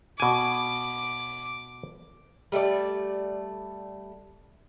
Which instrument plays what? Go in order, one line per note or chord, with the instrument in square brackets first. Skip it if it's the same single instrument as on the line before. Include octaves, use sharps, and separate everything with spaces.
[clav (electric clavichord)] B2 G#5 [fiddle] D6
[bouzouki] G3 A3 A4 D5